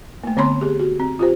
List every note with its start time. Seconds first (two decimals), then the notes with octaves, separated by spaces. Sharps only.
0.24 A3 A#3
0.37 D3 B3 C4 C#5 B5 C6
0.61 G4 G#4
0.80 F#4
0.99 C4
1.19 F4 G4 C5